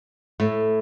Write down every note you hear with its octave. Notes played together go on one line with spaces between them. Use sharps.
A2 A3